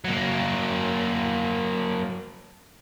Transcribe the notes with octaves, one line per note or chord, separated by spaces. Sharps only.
F#3 A#3